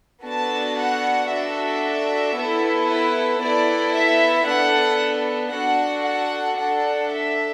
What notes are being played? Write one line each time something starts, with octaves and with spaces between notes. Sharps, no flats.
B3 D4 F#4 A4 A5
F#5
D4 F#4 A4 E5
B3 E4 A4
B4
B3 E4 A4 D5
E5
B3 D4 A4 F#5
D4 F#4 A4 F#5
F#5
D4 A4 F#5
E5